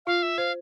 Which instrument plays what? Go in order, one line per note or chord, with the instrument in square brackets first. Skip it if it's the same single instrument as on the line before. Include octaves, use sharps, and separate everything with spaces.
[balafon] F4 [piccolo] F5
[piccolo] E5
[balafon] C5 [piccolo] F5